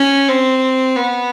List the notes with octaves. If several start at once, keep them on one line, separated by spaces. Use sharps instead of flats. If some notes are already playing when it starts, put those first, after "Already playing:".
Already playing: C#4
C4
B3